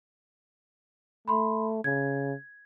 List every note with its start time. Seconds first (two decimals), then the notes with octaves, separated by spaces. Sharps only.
1.28 A3 B5 C6
1.84 C#3 G#6